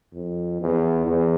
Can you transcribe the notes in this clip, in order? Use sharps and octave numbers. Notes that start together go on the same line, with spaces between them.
F2
E2
E2